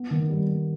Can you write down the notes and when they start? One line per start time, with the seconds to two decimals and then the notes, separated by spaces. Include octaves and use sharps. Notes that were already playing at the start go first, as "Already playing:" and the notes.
Already playing: B3
0.10 D#3
0.30 G3
0.47 G3